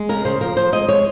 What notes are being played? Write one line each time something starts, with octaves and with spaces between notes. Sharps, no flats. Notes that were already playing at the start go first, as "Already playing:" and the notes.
Already playing: G#3
C#3 A#4
C#3 C5
F3 A#4
F3 C5
G#3 D#5
G#3 C#5